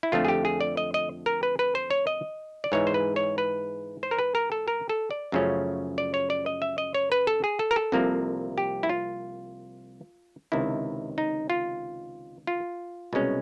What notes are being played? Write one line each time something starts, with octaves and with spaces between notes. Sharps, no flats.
E4
F2 D3 F3 A3 F4
G#4
G4
G#4
D5
D#5
D#5
A#4
B4
B4
C5
C#5
D#5
D5
G#2 E3 G#3 C#5
C5
B4
C#5
B4
C5
A#4
B4
A#4
A4
A#4
A4
D5
F#2 C#3 F3 A3 C#4
D5
C#5
D5
D#5
E5
D#5
C#5
B4
A4
G#4
A4
A#4
A4
C2 C3 F3 A#3
G4
E4
F4
C#2 C3 D#3 E4
D#4
F4
F4
C2 B2 G#3 C#4